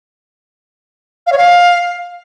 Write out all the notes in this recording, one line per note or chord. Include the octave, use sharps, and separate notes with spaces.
F5
C#5
F5